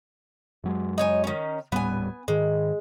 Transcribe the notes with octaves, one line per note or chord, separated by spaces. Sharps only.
F#2 F#3 G#3
D#4 C#5 G#5
D#3 C#4
D#1 A2 G3 B3 G#5
G#2 D#3 G#3